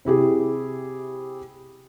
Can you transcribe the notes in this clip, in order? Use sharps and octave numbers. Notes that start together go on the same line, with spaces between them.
C3 E4 G4 G#4